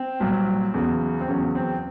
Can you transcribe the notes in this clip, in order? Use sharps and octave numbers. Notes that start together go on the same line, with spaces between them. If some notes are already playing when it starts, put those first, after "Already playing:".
Already playing: C4
C2 A#2 F#3
E2 C#3 F#3
C4
E2 C#3 F#3 C#4
C4